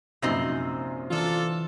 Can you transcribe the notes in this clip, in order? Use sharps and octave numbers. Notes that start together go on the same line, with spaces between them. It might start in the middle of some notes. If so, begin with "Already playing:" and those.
A#1 F#2 C3 C4 D#4 A#6
E3 D4 F4 A4